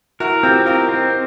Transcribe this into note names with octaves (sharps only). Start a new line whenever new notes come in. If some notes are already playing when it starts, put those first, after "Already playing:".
E4 F#4 A#4
C4 F4 G4
D#4 F4 A#4
C4